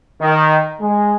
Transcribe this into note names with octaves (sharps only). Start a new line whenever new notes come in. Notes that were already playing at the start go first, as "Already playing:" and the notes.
D#3
G#3